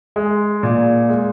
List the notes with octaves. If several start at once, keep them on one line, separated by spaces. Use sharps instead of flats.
G#3
A#2
G#3